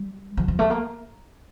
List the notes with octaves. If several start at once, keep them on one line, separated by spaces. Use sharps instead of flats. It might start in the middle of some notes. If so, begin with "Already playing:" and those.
Already playing: G3
F3
F3
A3
A#3